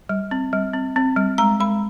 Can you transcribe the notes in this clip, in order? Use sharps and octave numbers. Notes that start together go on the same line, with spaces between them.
G3
C4
G3
C4
C4
G3
G#3 A#5
G#3 B5